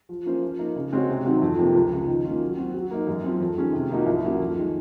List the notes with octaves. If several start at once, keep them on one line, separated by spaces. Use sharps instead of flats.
F3
A#3 C#4 F4 C5
F3
A#3 D#4
C#3
G#3 C4 F#4 C#5
C3
D#3 F#3 C4 D#4
F2
C3 F3 A#3
C#2
C#3 F3
D#3
A#3 C#4 F4
F#3
C4 F#4
F#3
A#3 D#4
F#2
F3 C4
F2
D#3 G#3 C#4 G#4
C3
F3 A#3 D#4 F#4
C2
A#2 F#3 A#3 C#4
F2
D#3 G#3